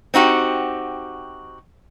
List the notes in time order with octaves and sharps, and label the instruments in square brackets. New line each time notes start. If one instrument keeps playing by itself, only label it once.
[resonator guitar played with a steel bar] C4 D#4 F#4 G4